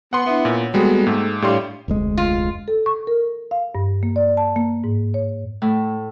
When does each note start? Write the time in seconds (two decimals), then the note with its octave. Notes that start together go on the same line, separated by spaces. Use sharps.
0.13 B3 F#5 C6
0.26 B3 D4 E4 E5
0.45 A#2 C#5
0.74 G3 G#3 A#3 B3 F#4 A4 G5
1.07 G#2 A3
1.42 A2 G3 D4 C#5 F5 C6
1.88 F1 D2 G#3
2.18 F4
2.68 A4
2.86 C#6
3.07 A#4
3.51 F5
3.75 G2
4.03 A#3
4.16 D5
4.37 A5
4.56 A#3
4.84 G#2
5.14 C#5
5.62 A2